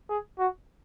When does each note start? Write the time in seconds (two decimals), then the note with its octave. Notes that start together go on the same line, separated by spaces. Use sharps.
0.09 G#4
0.39 F#4